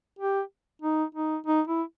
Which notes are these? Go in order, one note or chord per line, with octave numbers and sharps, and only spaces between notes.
G4
D#4
D#4
D#4
E4